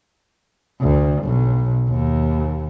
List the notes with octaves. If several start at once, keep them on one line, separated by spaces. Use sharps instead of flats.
D2
B1
D#2